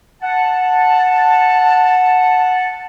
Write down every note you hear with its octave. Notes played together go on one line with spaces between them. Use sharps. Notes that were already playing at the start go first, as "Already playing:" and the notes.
F#5 A5